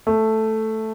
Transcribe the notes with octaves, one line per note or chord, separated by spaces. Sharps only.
A3